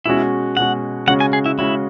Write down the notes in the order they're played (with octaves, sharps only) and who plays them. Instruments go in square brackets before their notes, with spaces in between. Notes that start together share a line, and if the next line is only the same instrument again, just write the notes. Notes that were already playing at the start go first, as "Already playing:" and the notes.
[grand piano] B2 G#3 C#4 F#4 [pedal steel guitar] E4
[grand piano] B2 G#3 C#4 F#4 [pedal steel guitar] F#5
[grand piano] C#3 G#3 C#4 F#4 [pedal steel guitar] F#5
[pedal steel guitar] G#5
G#4
E4
[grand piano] C#3 G#3 C#4 F#4 [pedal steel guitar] E4